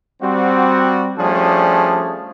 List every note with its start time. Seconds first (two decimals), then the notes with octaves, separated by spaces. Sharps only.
0.22 G3 C4 F#4
1.19 F3 G3 A3 C#4 D4 G#4